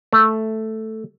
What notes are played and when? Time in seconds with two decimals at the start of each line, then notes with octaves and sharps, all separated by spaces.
0.13 A3